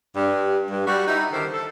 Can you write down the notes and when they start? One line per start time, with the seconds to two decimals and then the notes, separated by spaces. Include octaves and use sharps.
0.15 G2
0.69 G2
0.86 G3 F#4
1.07 D#4 E4
1.33 D3 D#3 G4 A4 C5
1.52 A4